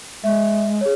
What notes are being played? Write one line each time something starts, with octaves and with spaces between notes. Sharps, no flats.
G#3 E5
G#4 C#5